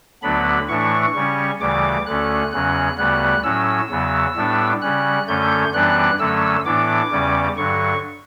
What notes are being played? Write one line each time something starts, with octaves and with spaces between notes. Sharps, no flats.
D2 D3 F#3 B3 D4 B5
A2 E3 A3 D4 C#6
C#3 G3 C#4
D2 C#3 E3 G3 D6
D2 D3 A3 C#4 F#6
E2 C#3 F#3 C#4 F#6
D2 C#3 G3 B3 F#6
A2 F#3 C#4 E6
E2 C#3 F#3 B3
A2 G3 B3 D4
C#3 G3 C#4 F#6
F#2 D3 A3 C#4 G6
F#2 E3 G3 B3 D4 F#6
F#2 D3 F#3 A3 C#4 E6
A2 E3 B3 D4 D6
E2 C#3 G3 C#4
G2 D3 F#3 C#6